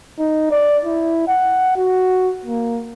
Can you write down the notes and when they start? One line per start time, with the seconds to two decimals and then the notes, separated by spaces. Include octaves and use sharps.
0.19 D#4
0.51 D5
0.85 E4
1.28 F#5
1.76 F#4
2.46 A#3